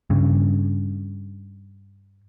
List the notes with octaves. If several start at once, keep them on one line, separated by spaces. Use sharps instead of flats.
G2 C#3